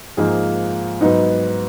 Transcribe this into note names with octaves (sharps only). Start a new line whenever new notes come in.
G#2 F3 A#3 G#4
G#2 F#3 B3 D#4